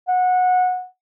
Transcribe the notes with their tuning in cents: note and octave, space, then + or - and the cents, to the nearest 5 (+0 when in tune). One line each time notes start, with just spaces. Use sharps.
F#5 -20